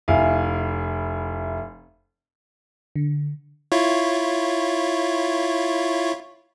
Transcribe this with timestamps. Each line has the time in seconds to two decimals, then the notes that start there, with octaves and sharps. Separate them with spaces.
0.08 F1 E4 F5 G#5
2.96 D3
3.72 E4 F4 C#5